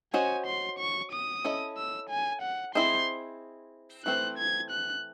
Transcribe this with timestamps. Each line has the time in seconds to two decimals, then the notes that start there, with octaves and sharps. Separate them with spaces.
0.14 C#4 F#4 C5 D#5 G#5
0.47 C6
0.79 C#6
1.12 D#6
1.44 C#4 E4 A4 D#5
1.77 E6
2.10 G#5
2.42 F#5
2.75 C4 E4 G#4 C5 D#5 C6
4.05 E3 A3 C4 F#4 C5 F#6
4.38 G#6
4.71 F#6